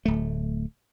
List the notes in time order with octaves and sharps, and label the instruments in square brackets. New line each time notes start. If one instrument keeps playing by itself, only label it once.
[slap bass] D1 A3